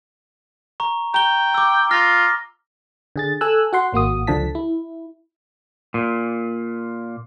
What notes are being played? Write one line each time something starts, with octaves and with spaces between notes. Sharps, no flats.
A#5 C#6
G5 A#5 G7
D6 E6
F4 F6 A#6
D3 G#4 A6
A4 G#5 E6 F#6
F#4 F#5 C6
G#1 A#3 F#4 D#6
C#2 D3 F3 A5 B6
E4
A#2